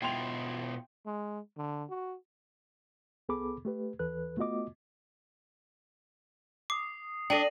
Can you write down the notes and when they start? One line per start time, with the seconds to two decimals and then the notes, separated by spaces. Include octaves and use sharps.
0.02 B2 E4 F4 G5 C6 F7
1.06 G#3
1.57 D3
1.90 F#4
3.29 C2 B3 G#4 A4 B5 D6
3.65 A3 G4 B4
3.99 D#2 E3 A4 B4 F#6
4.37 A3 B3 F4 F#4 D#5 D6
6.70 D6 D#6 C7
7.30 D4 A4 G5 A#6 D#7 F#7